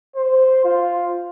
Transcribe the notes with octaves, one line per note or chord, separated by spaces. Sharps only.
C5
F4